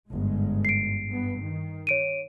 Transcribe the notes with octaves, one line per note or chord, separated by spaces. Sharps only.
G1 G#2 G#3
C7 D7
G2 B3
D#3
C#5 D7 D#7